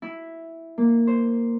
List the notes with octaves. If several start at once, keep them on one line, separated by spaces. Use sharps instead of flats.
E4
A#3
C5